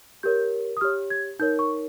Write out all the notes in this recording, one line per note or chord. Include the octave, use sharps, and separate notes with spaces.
G4 A#4 C#5 G6
D#6
G4 C#5 F6
G#6
D#4 A#4 C#5 G6
C#6